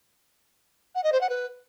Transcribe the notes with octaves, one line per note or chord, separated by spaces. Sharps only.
F#5
D#5
C5
F#5
B4